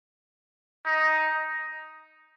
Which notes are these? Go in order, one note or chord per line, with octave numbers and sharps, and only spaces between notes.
D#4